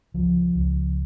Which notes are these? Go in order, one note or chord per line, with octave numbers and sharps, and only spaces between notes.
C#2 F3
C#2